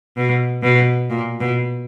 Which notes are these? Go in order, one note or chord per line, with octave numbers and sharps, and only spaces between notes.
B2
B2
A#2
B2